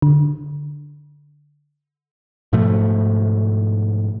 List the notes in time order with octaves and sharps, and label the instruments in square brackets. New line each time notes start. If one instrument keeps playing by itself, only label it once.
[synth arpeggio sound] D3
[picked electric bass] G#2 B2 F3 A3